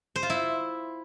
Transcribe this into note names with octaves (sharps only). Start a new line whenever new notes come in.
C5
F4
E4